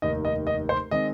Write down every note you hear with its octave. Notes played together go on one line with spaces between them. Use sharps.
F1 D#2 D#3 D#5
D#5
D#5
C5
D#3 G#3 C4 D#5